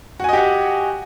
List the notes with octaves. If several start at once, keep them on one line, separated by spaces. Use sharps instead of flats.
F#4 G4 D#5 F#5 G#5